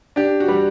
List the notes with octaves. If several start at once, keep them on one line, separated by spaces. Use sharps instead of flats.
D4 G4
F#4
G3